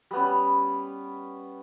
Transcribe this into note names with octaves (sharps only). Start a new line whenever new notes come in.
G3 B3 C#4